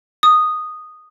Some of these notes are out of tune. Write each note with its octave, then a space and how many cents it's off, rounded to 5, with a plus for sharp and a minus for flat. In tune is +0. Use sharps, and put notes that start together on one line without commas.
D#6 -10